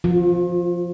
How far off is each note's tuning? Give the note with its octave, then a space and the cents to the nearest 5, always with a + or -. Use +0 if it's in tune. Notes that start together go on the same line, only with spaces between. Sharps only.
F3 +0 F4 +40